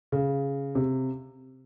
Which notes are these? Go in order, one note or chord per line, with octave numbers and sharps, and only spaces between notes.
C#3
C3